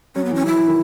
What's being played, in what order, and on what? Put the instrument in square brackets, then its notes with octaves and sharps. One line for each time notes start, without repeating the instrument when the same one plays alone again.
[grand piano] F#3 [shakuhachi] C#4
[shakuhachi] B3
[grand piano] E3 [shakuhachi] C#4
[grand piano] F#3 [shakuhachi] E4
[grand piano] E3
D#3